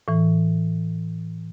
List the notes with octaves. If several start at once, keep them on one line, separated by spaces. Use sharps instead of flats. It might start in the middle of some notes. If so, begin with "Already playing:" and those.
A2 E3